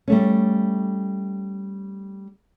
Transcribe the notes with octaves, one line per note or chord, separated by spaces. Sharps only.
G3 A3 C#4